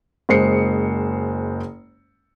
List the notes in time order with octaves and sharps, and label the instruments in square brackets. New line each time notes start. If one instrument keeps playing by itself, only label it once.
[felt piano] F#1 G#3 C5 C7 C#7